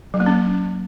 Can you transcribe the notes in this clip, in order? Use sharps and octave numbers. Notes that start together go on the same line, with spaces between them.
F#3
A#3
C#4